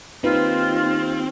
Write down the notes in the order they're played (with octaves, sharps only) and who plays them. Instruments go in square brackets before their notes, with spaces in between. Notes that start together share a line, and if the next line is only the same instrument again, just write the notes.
[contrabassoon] D#2 [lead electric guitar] C4 [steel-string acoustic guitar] D#4 B4 [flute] F4